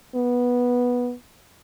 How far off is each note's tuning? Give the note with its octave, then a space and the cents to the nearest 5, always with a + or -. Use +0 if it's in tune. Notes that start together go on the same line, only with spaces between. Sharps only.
B3 -10